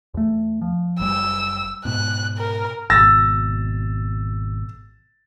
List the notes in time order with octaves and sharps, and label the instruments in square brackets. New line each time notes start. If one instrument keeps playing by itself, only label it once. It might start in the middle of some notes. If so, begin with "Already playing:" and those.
[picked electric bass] E2 A3
F3
[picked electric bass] F#1 G3 [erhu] E6
[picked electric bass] G#2 B2 [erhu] F#6
[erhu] A#4
[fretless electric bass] G#1 B2 [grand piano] E6 A6 A#6